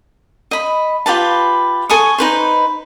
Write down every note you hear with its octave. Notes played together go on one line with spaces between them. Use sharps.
D#5 B5
F4 G4 B4 A5
A4 G#5 C#6 D#6
D#4 B4 C5